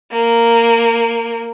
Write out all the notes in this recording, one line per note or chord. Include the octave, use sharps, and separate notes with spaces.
A#3